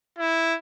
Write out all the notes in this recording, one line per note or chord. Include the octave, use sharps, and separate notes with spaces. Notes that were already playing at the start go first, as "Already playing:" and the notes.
E4